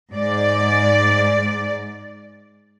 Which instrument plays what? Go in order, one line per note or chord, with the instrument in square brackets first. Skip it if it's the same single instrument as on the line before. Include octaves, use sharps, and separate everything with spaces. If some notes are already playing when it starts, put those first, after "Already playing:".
[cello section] G#2 D5